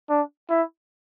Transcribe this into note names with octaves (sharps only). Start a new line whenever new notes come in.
D4
E4